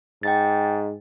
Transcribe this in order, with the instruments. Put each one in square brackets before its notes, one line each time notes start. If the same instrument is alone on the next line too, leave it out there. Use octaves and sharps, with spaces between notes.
[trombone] G#2 [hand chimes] G5 A6